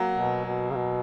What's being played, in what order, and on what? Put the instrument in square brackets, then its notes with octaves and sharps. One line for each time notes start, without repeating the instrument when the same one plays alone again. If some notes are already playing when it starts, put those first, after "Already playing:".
Already playing: [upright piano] F#3 A#3
[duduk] B2
B2
C#3
B2